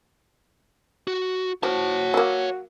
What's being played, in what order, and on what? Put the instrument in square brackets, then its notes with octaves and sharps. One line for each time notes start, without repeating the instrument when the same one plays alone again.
[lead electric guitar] F#4
[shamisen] F3 [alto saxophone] F#4 [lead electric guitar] C#5 A5
[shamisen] F#3 A#3